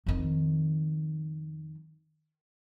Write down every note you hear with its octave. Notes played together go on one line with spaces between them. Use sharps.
F2 D#3